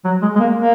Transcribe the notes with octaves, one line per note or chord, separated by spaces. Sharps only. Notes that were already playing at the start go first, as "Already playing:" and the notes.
F#3
G#3
G#3
A#3
A#3